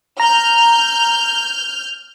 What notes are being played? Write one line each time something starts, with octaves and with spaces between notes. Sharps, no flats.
A#5 F6 G6